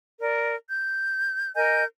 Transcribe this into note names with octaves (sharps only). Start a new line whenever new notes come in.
A#4 D5
G6
A#4 D#5 G#5 G6